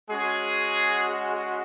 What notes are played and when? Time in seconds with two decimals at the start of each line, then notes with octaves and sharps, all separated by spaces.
0.10 G#3 C#4 F#4 G#4
1.27 G#4